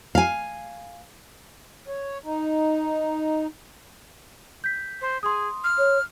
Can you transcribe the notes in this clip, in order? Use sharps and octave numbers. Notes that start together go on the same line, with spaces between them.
F5 G#5
C#5
D#4
G6 B6
C5
G#4 C6 D#6
F6
C#5